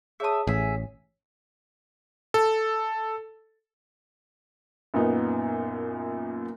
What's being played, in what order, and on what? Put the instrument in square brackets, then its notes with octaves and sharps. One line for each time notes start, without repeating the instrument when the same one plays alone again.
[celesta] G#4 C#5 A5 [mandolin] E5 D#6
[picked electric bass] A1 [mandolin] G#4 E5 [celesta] C#5
[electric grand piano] A4
[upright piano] F#2 A#2 B3 D#4